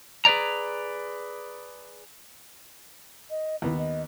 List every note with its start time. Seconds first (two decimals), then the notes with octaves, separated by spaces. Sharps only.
0.25 G#4 B4 C5 D5 A#5
3.30 D#5
3.62 D#2 B3 E4
3.78 D#5